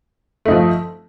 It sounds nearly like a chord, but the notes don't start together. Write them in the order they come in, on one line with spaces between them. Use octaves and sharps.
A3 D#4 F3